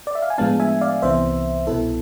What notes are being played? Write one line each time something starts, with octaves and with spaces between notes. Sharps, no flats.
D5
E5
F5
G#5
A2 F3 G#3 B3 D4 F5 A5
E5 G#5
D5 F5
C2 C3 E3 B3 C5 E5
C2 B2 B3 E4 A4